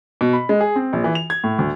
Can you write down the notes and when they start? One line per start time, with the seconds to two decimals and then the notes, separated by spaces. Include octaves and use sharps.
0.21 B2
0.33 B5
0.49 G#3
0.61 G#4
0.76 C4
0.93 A#1
1.04 E3
1.15 F7
1.30 G#6
1.44 A2
1.59 D2